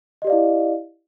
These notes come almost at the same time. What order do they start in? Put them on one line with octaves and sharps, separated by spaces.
D#5 G4 D5 F5 E4